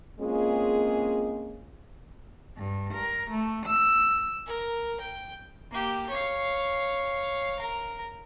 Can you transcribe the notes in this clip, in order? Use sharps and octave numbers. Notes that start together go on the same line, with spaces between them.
G#3 A#3 C4 C#4 F4 G#4
G2
A#4
A3
E6
A#4
G5
A#3 G4
C#5 F5
A#4 A#5